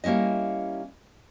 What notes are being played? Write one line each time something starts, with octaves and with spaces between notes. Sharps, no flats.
G3 A#3 C#4 E4 D#5